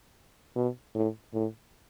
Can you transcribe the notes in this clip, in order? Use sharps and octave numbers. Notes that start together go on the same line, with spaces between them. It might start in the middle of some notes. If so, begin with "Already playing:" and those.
B2
A2
A2